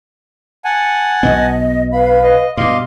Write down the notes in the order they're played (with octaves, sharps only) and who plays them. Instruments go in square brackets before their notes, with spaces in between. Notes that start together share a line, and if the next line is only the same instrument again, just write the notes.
[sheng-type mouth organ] F#5 G#5 A5
[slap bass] B1 B2 B3 [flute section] D#5
[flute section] B4 F5 [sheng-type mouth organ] B5
[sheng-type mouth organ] D#5
[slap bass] G2 B2 [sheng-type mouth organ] D#5 F5 C6 [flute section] D6